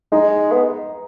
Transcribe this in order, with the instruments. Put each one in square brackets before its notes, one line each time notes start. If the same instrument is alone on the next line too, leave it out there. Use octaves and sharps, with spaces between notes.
[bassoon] G#3 [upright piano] D#4
[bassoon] B3